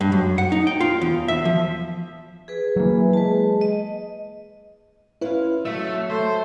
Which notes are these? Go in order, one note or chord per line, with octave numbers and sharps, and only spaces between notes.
G2
F#2
F#5
D#4
G5
F4
E2
E5
F3
G#4 B4
E3 F#3 A#3
G#3 B4 A5
D#5
C#4 E4 F4 B4 F5
F#3 A3 E5 E6 B6
A3 C5